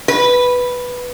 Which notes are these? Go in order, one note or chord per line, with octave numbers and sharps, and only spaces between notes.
B4